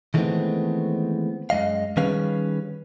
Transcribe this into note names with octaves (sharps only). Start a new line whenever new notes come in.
D#3 E3 G#3 A3 B3 C4
F#2 G#3 D#5 F5
D#3 G3 C#4 G#4 B4 F5